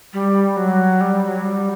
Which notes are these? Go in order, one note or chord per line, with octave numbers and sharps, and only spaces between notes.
G3
F#3
G3
G3
F#3
G3